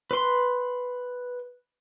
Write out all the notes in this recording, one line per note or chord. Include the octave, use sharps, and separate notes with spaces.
B4 C6